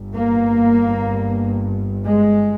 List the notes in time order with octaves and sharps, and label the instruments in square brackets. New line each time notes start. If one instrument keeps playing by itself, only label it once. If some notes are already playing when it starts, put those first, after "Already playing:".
Already playing: [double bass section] G1 G2
A#3
G#3